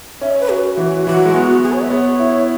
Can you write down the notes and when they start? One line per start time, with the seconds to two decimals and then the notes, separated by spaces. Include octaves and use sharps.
0.21 C#4 E5
0.31 C#5
0.40 B4
0.50 F#4
0.77 E3
1.06 E3 F#4
1.15 F#3
1.25 G#3
1.35 B3
1.62 G#4
1.73 C#5
1.81 E5
1.90 B3 C#5
2.20 E4